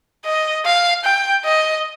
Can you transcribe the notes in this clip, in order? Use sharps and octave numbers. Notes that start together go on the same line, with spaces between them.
D#5
F5
G5
D#5